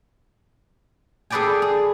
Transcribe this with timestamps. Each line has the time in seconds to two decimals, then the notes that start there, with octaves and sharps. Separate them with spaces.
1.30 G#4 A4 B4 D5 G5 G#5
1.62 G#4